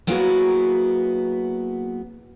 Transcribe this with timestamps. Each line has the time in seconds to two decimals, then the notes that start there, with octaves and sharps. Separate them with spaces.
0.07 F#3 A#3 B3 E4 F#4 G#4